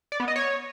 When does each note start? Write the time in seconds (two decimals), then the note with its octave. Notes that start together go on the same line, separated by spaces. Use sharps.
0.12 D5
0.20 B3
0.28 D#5
0.36 C#5